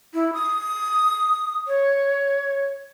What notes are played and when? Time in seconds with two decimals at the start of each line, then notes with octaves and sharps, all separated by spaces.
0.14 E4
0.33 D#6
1.68 C#5